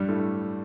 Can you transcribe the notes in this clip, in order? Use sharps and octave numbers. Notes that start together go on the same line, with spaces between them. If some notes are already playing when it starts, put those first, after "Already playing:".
Already playing: G2 G3
A2 A3